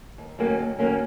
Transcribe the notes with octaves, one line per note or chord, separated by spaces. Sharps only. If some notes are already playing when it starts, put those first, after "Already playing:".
D#2
D#3 F#3 A#3 C#4
D#2
D#3 F#3 A#3 C#4